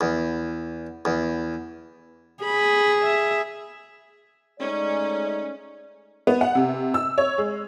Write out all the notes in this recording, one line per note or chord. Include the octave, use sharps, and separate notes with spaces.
E2
E2
G#4 B5
E5
G#3 A3 C#4 D#4 D5
B3
F#5
C3
E6
C#5
G#3